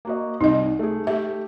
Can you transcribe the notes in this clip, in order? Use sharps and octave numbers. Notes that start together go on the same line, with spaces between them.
A#3 F#4 D#5
C2 D#4 D#5
A3 G#4
A3 G4 E5